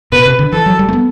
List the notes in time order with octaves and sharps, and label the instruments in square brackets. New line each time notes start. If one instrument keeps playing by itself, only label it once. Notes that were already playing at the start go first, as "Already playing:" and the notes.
[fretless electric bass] B2 [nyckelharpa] B4
[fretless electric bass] C3
D3
[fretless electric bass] E3 [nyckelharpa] A4
[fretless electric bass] F#3
G3
A3
B3